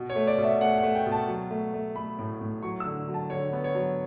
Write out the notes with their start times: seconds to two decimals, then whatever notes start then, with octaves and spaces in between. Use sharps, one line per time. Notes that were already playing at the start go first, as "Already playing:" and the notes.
Already playing: B2
0.10 C#5
0.16 A3
0.27 D5
0.38 B2
0.44 E5
0.61 A3 F#5
0.78 F#5
0.83 A3
0.95 G5
1.06 B2
1.12 A5
1.28 F#3
1.51 A3
1.74 A3
1.96 A3 B5
2.19 A2
2.41 A2
2.63 F#3 C#6
2.80 E6
2.85 D3
3.09 F#3
3.14 A5
3.30 D3 C#5
3.53 B3
3.64 C#5
3.75 F#3